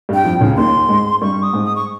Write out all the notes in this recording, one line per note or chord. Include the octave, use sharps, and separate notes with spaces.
G2 G3
G5
F2 F3
C#2 C#3
D#2 D#3 C6
G#2 G#3
G2 G3 C#6
D#6
G#2 G#3
D#6
C#6